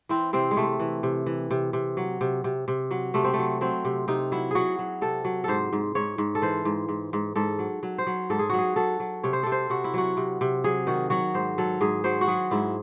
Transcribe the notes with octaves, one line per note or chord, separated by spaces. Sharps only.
E3 C4
C3 C4
G#3
C3 A3
E3
C3
E3
C3
C3
F#3
C3
C3
C3
F#3
C3 A3
C4
F#3 A3
F#3 C4
C3
C3 D#4
F#3 E4
F#3 F#4 G#4
F#3
C3 A4
F#3
G#2 A4 C5
G#2
G#2 C#5
G#2
A4
E3 C5
G#2
G#2
G#2
G#2 A4
F#3
F#3
C5
F#3
G#2 A4
G#4
F#3 F#4
G#4
F#3 A4
F#3
C3 C#5
C5
C3 A4
C5
C3 F#4
E4
F#3 F#4
C3
C3
F#3 G#4
D#3 F#4
F#3 F#4
G#2 C5
F#3 A4
G#2 G#4
F#3 C5
F#4
F#3 G#4
G#2 E4